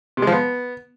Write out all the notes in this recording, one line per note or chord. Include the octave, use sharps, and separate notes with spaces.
C3
G#3
F3
B3